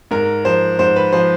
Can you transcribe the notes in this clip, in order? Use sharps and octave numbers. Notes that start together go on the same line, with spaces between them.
G#2 A#4
F3 C5
G#2 C5
B4
F3 C5